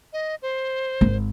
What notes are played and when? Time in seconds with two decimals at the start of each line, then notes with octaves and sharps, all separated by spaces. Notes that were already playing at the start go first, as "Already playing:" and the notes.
0.13 D#5
0.42 C5
1.01 G#1